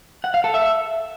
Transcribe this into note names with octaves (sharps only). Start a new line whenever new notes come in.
F#5
F5
A4
E5